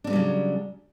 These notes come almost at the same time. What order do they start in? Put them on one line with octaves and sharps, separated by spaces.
D4 C4 G3 F#3 C#3